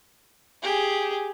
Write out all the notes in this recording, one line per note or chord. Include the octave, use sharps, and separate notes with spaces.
G4 G#4